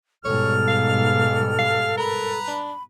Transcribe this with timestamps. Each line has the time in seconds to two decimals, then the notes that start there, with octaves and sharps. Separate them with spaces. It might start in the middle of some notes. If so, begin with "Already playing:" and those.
0.25 G#2 B2 G3 A4 C#5 F6
0.68 F5
1.59 F5
1.97 A#4 B4 A#5
2.47 D4 B5